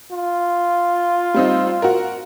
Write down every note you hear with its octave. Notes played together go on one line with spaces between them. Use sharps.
F4
G3 C4 D#4
F#4 A#4